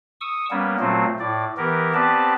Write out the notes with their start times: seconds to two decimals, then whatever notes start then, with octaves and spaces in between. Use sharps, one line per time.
0.21 C#6 D#6 E6
0.51 G3 A#3 B3 C#4
0.80 A#2 F#3 A3 C4 C5
1.20 A2 D5
1.57 E3 B3 G4 A#4
1.94 B3 C4 G4 B4 D5 A5